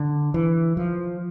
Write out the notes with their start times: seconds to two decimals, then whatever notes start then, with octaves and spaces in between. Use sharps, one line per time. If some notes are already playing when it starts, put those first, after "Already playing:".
Already playing: D3
0.34 E3
0.77 F3